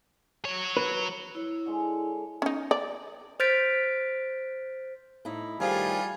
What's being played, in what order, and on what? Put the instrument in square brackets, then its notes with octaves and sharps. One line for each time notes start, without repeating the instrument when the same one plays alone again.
[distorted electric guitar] F#3 C#5
[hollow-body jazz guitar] B4
[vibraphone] E4 C#5
[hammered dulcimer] D3 G#3
[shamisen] C#4 D#4
D5
[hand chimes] C5 F6 G6 A6 B6 D7
[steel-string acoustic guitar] A2 D#4 E4
[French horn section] A2 G4 [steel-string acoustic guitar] D#3 F3 [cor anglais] G3 [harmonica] F4 G#4